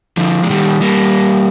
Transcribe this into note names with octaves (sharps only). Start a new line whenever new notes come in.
D3 F3
G#3
D#3 G3
G3 A#3